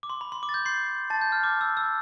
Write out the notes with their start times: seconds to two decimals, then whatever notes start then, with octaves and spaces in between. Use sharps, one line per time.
0.03 D6
0.10 C6
0.21 B5
0.32 C6
0.43 D6
0.49 A6
0.54 G6
0.65 C6 C7
1.10 A5 A6
1.21 G6
1.32 F6
1.43 D6
1.61 E6
1.77 E6